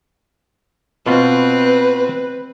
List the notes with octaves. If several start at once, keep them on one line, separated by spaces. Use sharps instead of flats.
B2 C4 F4 B4